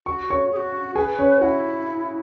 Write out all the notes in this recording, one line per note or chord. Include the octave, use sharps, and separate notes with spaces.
F#4 C#6
C#5 C#6
G#4
F#4
G#4 B4 G#5
C#4 C#5
E4 F#4 F#5